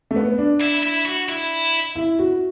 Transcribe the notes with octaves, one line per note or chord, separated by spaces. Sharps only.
A3
B3
D4
E4
E4
F#4
E4
E4
F#4